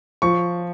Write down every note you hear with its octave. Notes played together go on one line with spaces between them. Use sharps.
F3 C#6